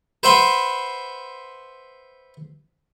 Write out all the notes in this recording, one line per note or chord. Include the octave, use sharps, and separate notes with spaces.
B4 C5 E5 F#5 B5 C6